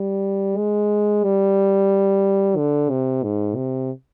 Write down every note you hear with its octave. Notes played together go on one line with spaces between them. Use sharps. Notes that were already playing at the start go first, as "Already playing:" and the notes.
Already playing: G3
G#3
G3
D3
C3
G#2
C3